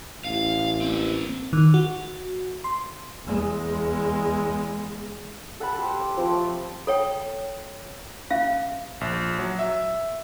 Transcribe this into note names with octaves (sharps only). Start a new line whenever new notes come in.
A1 F5
A#3 C4
D#3
F#4
C6
E2 G#3
A4 F#5 A5 B5
G4 C5
D6
F3 C4 G4
A3
A4 C#5 G5
C#4 E5 F5
A#1
F#3
E5